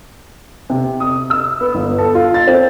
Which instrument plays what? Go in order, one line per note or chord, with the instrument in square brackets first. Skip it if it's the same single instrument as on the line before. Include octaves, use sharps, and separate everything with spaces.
[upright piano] C3
D#6
E6
B3
G1
A4
F4
A6
C4